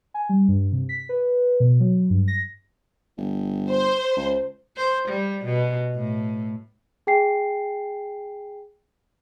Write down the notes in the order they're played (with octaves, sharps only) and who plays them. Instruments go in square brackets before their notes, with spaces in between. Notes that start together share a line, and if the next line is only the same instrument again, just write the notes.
[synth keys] G#5
G3
G2
C3
B6
B4
B2
F#3
G2
A#6
[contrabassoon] G1
[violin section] C5
[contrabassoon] C#2
[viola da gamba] C5
G3
B2
A2
[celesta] G#4 G5 G#5 C7